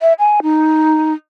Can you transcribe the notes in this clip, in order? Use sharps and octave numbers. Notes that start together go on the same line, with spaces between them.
E5
G#5
D#4